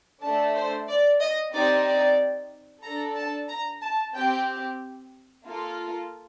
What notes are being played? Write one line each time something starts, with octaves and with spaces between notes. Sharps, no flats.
A3 D4 A4 A5
C5
D5
D#5
C4 D#4 G4 D5
D5
D4 A4 A#5
A5
A#5
A5
C4 G4 G5
A#3 F4 A4